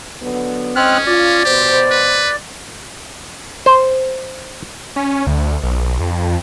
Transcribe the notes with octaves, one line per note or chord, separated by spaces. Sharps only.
D3 F#3 B3
F2 G#2 C4 C#4 D#5 F6 F#6
F4 D5
B2 G4 C5
B4
C5
C#4
D2
B1
F2